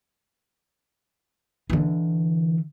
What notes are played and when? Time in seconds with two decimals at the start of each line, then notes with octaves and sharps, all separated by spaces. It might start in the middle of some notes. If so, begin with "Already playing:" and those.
1.70 D3 E3